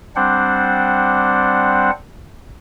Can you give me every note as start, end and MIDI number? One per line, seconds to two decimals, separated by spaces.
0.16 1.91 55
0.16 1.91 60
0.16 1.91 62
0.16 1.91 72
0.16 1.91 78